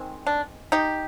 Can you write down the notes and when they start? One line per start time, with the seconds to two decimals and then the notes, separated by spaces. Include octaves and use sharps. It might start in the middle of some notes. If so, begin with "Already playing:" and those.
Already playing: D#3 G#3 C4
0.27 D4
0.72 D#4 G4